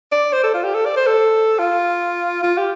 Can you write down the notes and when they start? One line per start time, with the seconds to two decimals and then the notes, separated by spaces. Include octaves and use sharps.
0.12 D5
0.33 C5
0.43 A4
0.54 F4
0.64 G4
0.74 A4
0.85 D5
0.96 C5
1.07 A4
1.59 F4
2.43 F4
2.58 G4